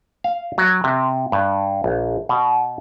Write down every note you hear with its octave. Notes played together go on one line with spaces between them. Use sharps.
F5
F#3
C3
G2
A#1
B2